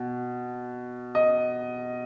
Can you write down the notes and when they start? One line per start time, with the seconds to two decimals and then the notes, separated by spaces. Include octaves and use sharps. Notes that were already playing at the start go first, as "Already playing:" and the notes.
Already playing: B2
1.15 D#5